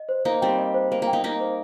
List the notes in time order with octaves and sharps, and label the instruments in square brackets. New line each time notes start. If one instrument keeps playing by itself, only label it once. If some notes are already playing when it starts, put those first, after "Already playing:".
Already playing: [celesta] D#5
C5
[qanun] A#3 D#4 [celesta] C5
[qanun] G3 C4 [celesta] G5
[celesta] D#5
C5
[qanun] A#3 [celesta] C5
[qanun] A#3
[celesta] G5
[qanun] A#3 D#4
[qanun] A#3 D#4 [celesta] G5
[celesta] C5